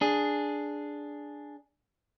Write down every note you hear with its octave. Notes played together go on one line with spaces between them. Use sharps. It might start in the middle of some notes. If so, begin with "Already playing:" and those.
D4 G#4